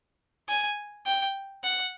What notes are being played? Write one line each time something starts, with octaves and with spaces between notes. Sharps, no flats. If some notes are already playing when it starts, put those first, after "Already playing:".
G#5
G5
F#5